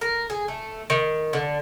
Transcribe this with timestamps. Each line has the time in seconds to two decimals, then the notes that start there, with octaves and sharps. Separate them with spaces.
0.01 A#4
0.30 G#4
0.48 A3
0.90 D#3
1.33 D3